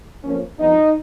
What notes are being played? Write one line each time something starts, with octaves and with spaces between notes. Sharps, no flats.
F2 F3 A#3 C#4
F2 F3 G#3 B3 D#4